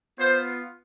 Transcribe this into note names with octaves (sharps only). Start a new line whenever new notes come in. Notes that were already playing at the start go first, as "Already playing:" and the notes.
B3 F4 C5